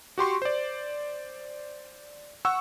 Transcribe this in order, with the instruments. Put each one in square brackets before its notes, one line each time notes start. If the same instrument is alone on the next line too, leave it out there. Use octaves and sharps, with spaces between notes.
[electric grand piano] F#4 G4 C6 C#6
C5 D5
F#5 C#6 E6